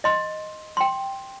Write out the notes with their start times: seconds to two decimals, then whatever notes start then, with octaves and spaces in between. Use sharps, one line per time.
0.04 D#5 C6
0.77 G5 C6